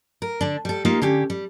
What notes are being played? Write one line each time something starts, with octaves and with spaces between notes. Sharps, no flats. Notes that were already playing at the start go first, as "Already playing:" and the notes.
A#4
D3 D4
G3 A4
A#3 D#4 F4 G4
D3 C#4 G4
G3